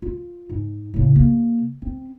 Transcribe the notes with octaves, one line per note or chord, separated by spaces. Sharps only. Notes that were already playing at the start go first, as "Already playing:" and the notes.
F4
G#2
A2 C#3
C3 A#3
C4